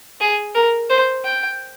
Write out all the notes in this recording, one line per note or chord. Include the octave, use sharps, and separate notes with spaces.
G#4
A#4
C5
G5